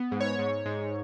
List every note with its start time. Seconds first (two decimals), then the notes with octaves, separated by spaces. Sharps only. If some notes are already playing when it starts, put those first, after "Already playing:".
Already playing: B3
0.11 G#2
0.20 C#5
0.39 G#2
0.66 G#2